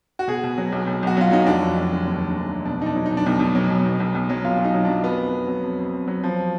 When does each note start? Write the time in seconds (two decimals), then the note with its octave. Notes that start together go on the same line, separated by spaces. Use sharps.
0.19 F#4
0.28 B2 G#4
0.43 B2
0.58 F#3
0.72 B1
0.87 B1
1.03 B1 F#4
1.17 F#3 F4
1.32 F#3 D#4
1.46 F1 D4
1.62 F1
1.77 F1
1.92 D3
2.06 D#2
2.22 D3
2.36 F1
2.51 F1
2.65 B2 D4
2.81 B2 D#4
2.86 D4
2.96 F#3
3.06 D#4
3.11 B2
3.17 D4
3.26 B1 D#4
3.40 B2
3.55 F#3
3.71 B2
3.86 B1
4.00 B1
4.15 B1
4.29 F#3
4.44 B2 F4
4.59 F#3
4.64 D#4
4.74 F#3
4.85 F#3 D4
5.04 F2 B3
5.18 F2
5.34 F2
5.48 F#3
5.64 F2
5.79 F2
5.93 F2
6.08 F#3
6.24 F3